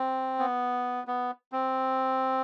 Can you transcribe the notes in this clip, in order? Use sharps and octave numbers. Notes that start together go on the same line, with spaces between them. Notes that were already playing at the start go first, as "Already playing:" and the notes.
Already playing: C4
B3
B3
C4